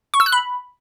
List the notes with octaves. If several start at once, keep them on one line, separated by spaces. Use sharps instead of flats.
C#6
E6
F#6
B5